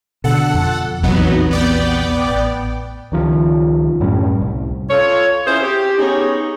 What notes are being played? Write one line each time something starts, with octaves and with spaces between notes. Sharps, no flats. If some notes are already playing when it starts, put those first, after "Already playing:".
B2 D3 A4 F#5
F2
A#1 E2 C3 F#3 B3 D#4
B3 D5 G5
A1
C#2 D#3 F3
F#2 A2 G3 C#4
C2
F4 A4 C#5
C#4 E4 G#4 C5
G4
B3 C#4 D#4 G#4 C#5